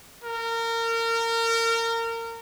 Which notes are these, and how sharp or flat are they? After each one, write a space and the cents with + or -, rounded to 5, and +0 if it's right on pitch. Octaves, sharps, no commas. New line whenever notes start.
A#4 -25